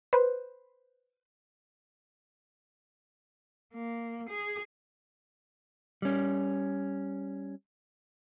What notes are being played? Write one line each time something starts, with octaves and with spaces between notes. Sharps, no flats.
B4 C5
A#3
G#4
G3 C#4